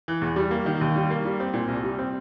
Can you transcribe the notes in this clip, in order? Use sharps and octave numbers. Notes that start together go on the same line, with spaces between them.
E3
E2
G3
A#3
D#3
D#2
G3
A#3
G3
C4
A#2
C2
G3
C4